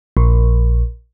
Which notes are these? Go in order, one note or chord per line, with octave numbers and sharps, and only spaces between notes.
A#1